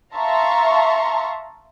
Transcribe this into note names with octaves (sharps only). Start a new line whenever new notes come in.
E5 F5 A5 A#5 C6 C#6